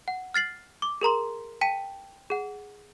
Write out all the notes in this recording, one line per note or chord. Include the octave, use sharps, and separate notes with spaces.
F#5
F6 A6 C7 F#7
D6
G#4 A#4 A#5 C6
G5 A5 B6 D#7
G#4 F#5